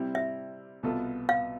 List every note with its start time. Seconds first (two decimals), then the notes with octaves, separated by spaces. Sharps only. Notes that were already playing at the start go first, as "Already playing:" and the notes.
Already playing: C3 G3 C4 E4
0.15 E5
0.83 C2 B2 B3 F4 A4
1.29 F5